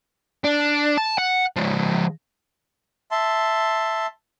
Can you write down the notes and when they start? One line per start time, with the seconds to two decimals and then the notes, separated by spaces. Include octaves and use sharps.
0.44 D4
0.98 A5
1.18 F#5
1.56 F3 G#3
3.11 E5 A5 C6